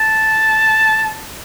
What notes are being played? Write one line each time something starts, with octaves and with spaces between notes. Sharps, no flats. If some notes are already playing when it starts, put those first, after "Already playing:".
Already playing: A5